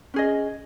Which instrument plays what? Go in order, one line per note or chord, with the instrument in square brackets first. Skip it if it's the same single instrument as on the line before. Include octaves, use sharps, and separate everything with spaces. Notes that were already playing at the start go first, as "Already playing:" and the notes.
[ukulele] C#4 G#4 D#5